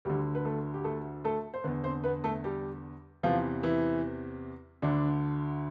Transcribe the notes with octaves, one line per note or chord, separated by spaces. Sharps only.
D2 D3 G3 G4
B4
A3 A4
G4
A3 A4
A3 A4
C5
E2 D3 B3 B4
C4 C5
B3 B4
A3 A4
G3 G4
E2 C3 E3 F3 F4
E3 E4
D2 D3 D4